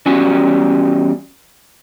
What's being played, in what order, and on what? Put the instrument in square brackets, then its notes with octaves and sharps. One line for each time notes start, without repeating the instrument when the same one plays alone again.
[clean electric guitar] E2 G3 C#4 F#4 G#5